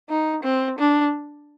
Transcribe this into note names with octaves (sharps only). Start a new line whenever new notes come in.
D#4
C4
D4